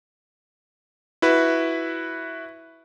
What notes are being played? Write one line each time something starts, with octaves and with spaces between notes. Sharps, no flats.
E4 F#4 B4